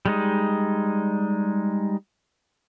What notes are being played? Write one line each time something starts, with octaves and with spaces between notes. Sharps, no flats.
G3 G#3 D#4